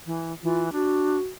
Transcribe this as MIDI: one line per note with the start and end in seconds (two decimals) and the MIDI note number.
0.06 0.33 52
0.43 0.72 52
0.43 0.64 65
0.72 1.18 62
0.72 1.31 66